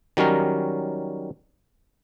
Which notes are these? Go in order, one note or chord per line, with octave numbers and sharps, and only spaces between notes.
D#3 F#3 G3 C#4 A#4